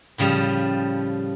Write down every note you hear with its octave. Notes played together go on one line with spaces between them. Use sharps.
A2 C#3 F3 G3